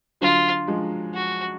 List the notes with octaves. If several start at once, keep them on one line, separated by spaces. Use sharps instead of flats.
D3 F#3 F4
F3 G#3
F#4